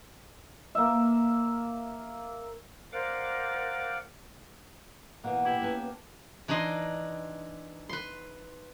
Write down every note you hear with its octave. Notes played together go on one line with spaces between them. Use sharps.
A#3 E5
A#4 C5 D5 F5 F#5 D6
B2 E3 A#3 F#5
E4 G4
B3 C#4 A5
E3 D4 D#4 D#5 C6
B4 C6